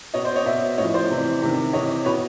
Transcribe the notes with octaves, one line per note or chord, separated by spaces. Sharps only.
B2 C#5 D#5
C5 D5
C#5 D#5
B2 D5 E5
A2 F3 C#5 D#5
C5 D5
C3 E3
C3 D#3
C3 E3 C#5 D#5
B2 B4 C#5